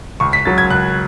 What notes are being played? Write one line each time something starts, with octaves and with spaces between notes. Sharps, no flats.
C#2 C#6
B6
C#3 F#3 A6
G#6
C#2 F#6